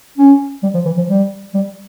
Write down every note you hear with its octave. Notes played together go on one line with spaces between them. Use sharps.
C#4
G3
F3
E3
F3
G3
G3